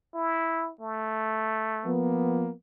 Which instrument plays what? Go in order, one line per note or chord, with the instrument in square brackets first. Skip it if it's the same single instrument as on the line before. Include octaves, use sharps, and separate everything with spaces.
[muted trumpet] E4
A3
[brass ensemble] F3 A#3 B3